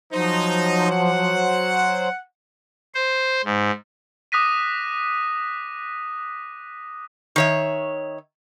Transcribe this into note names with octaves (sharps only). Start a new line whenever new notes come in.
F3 F#3 D#4 C5
F#5
C5
G#2
D6 D#6 F#6 A#6 B6 D#7
D#3 C#5 E5